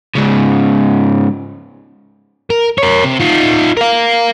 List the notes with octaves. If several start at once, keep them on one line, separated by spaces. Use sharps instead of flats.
G#2 C#3
A#4
A#4 C#5
C3
D#4 F4
A#4 F5